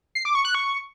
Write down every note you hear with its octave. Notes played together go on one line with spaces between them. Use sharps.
C7
D6
C#6
F#6
C#6